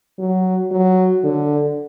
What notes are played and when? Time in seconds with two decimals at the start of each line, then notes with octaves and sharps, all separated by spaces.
0.19 F#3
0.71 F#3
1.24 D3